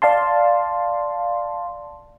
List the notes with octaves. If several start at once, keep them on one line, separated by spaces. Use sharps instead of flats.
D5 F5 A5 C6